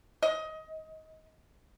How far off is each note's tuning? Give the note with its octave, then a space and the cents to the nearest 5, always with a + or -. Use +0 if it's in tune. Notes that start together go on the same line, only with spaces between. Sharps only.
D#5 +20